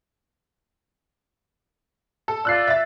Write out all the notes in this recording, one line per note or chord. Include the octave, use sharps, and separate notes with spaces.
A4
F4 D5 E6 F#6 C7
E5 A6